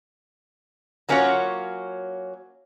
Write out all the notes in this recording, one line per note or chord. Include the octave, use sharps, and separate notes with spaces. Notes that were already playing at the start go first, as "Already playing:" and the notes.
F#3 A#3 C#4 F4 F#4 C#5